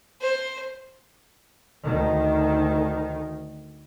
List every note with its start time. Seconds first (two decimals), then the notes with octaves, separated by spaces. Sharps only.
0.22 C5
1.84 D2 D#3